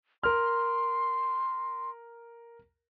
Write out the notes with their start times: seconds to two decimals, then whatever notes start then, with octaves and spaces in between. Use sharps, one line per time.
0.23 A#4 C6 F6